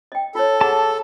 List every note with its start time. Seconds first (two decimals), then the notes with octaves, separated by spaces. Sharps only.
0.12 D#5 G5
0.35 F4 A4 C#5
0.61 G#4 F#5 A5